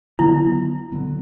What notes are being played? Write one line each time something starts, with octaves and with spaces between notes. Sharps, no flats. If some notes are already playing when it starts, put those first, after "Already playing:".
D3 F#3 B3 E4
D3 F#3 B3